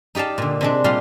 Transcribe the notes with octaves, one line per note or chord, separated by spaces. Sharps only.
D#4 G4 D5 F5 A5
A#2 D3
C3 G#3 D4
A#2 G3 F4 F5 C6